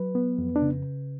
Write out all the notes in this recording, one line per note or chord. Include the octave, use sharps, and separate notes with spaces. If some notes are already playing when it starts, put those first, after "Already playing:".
Already playing: F#3 B4
B3
F2
D4
C#3